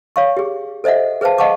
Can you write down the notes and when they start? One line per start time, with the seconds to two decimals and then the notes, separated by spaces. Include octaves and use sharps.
0.16 C#5 F5 C#6
0.37 G4 G#4
0.84 A4 C5 D#5 E5 F#5
1.21 G#4 B4 C5 F5 A5
1.38 D#5 F5 F#5 A5 C#6 D6